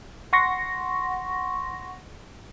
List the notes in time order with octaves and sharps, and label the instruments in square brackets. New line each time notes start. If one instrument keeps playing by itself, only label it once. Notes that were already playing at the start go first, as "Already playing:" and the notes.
[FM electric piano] F#5 C6 C#6 A#6